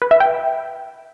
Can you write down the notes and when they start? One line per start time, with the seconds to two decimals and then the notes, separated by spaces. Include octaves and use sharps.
0.02 B4
0.11 E5
0.20 G5